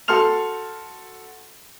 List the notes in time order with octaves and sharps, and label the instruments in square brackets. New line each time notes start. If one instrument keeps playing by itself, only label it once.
[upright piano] F#4 A4 C6 F6 F7